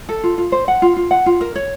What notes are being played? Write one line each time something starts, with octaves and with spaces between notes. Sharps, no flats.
A4
F4
F4
C5
F#5
F4
F4
F#5
F4
A#4
C#5